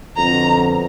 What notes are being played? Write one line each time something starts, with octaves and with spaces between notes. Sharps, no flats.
F2 B2 D3 A#5